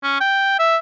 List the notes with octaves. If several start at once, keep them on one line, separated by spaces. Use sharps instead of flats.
C#4
G5
E5